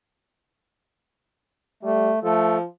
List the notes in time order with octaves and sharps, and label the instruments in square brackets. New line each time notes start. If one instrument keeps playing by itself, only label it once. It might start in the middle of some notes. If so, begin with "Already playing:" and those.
[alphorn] G3 [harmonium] A3
[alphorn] F3 [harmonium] A3 A4